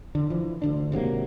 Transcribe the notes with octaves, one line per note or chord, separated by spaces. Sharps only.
D3
E3 F3
D2 D3 D4
G#1 C3 F#3 A#3